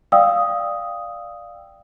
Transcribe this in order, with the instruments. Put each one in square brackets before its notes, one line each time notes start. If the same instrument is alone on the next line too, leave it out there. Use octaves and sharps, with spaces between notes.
[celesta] D5 F5 G5 D#6 E6